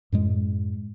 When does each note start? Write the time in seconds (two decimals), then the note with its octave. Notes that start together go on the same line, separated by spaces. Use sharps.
0.12 F#2 A2 G#3